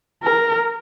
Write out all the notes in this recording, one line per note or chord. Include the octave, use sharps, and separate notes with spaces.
A#4